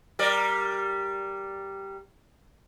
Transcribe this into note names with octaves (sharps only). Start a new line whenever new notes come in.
G3 A#4 D5